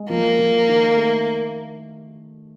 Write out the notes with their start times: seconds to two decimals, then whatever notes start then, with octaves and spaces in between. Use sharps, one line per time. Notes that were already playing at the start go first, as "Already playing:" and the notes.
Already playing: G#3
0.09 F3 A#3
0.39 F3
0.68 D#3
0.97 A3